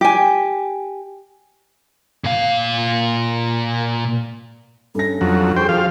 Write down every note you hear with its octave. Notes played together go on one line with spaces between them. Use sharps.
G4 G#5
A#2 F5
G2 C#4 A4 A#6
F2 F#3
G#4 C5 G5 C#6
F3 F#4 F5